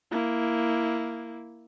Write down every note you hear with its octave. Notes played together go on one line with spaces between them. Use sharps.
A#3 E4